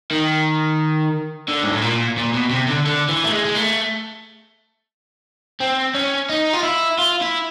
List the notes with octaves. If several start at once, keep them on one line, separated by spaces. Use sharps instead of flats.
D#3
D3
G#2
A2
A#2
A#2
B2
C3
D3
D3
E3
A3
G#3
G#3
A3
C4
C#4
D#4
F4
E4
F4
E4